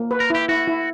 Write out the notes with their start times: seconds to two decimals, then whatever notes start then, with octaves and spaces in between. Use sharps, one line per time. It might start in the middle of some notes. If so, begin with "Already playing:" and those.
Already playing: A#3
0.11 B4
0.20 A#4
0.30 E4 G4
0.49 E4 F#4
0.68 E4